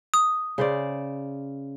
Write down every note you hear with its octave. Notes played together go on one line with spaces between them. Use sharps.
D#6
C#3 C5 D5